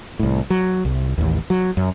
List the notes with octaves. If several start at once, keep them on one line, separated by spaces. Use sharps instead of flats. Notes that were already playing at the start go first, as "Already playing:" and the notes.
C2 A2
F#3
C2
A1 D#2
F#3
F#2